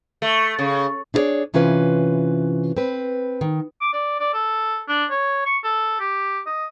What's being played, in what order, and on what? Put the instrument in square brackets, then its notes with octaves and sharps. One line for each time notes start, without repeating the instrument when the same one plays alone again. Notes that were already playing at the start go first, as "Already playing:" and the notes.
[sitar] A3
C#3
[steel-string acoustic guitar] D4 E4 G#4 B4 C#5 D5
C3 E3 C#4 F4 B4
C4 B4
D#3
[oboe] D6
D5
D5
A4
D4
C#5
C#6
A4
G4
D#5